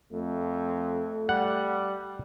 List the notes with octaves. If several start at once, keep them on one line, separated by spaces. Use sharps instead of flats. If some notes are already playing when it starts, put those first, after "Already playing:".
F2 A3
G3 F#5